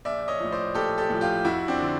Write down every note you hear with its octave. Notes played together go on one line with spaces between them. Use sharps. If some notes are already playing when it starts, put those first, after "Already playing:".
A#1 D5 E5
C#5 D#5
A2 F3
C5 D5
A#1 G4 A4
G4 A4
A2 F3
F4 G4
F2 E4 F#4
C4 D4
D3 F3